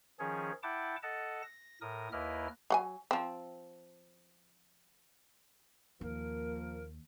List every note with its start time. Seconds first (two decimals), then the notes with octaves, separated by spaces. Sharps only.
0.19 D#3 F3 C#4 G#4 C#5
0.63 E4 F#5 G5 A5 D6
1.03 A4 D#5 F#5 A5
1.42 A#6
1.81 A2 A#4 D#6
2.12 D#2 A#3 E4 B4 D#5 F6
2.70 F#3 F#5 G#5
3.11 F3 C4
6.01 D#2 F3 A#3 A#4